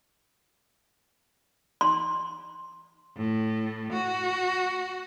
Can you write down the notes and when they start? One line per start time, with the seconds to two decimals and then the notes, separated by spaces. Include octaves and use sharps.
1.81 C6
3.17 A2
3.92 F#4